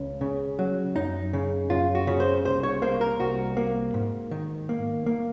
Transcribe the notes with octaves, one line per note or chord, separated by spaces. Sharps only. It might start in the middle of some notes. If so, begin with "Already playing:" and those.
Already playing: C#2 C#4
C#3
F#3
F#2 D#4
C#3
F#2 F4
F#4
C#3
C5
C2 C5
C#5
A#3 C5
A#4
C2 F#4
A#3
G#2
D#3
A#3
A#3